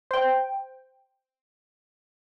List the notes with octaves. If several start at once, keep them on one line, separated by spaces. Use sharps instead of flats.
C5 G5